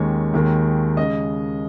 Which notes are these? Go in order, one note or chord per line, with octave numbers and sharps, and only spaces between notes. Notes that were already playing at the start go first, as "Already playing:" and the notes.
Already playing: D#2 D#3 G#3 C#4 C#5
D#2 D#3 G#3
C#3 G#3 D#5